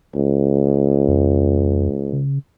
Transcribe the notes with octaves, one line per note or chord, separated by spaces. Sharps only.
C#2
F2
C#3